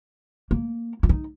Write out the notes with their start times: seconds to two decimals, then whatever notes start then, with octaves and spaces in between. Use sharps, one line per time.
0.51 A#3
1.03 E4
1.09 D#4